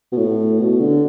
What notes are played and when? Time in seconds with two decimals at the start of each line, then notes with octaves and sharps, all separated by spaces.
0.12 B2
0.17 A2
0.59 B2
0.80 D3